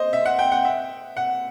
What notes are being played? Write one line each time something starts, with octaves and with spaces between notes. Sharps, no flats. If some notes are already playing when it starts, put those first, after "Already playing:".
Already playing: C5 D#5
E5
F#5
G5
F#5
E5
F#5